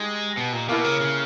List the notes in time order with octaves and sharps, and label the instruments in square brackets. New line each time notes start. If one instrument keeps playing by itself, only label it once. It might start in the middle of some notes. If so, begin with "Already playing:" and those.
Already playing: [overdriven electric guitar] G#3 [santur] D#4 G4
[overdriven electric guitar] B2
A#2
[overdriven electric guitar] B2 [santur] A#3 E4 A#4
[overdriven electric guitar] C#3
C#3